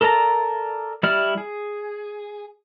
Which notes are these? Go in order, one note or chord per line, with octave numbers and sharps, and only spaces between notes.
A4 A#4 D5 A5 A#5
G3 E4 D5 F6
G#4